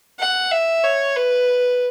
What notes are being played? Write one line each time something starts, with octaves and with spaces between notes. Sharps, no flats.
F#5
E5
C#5
B4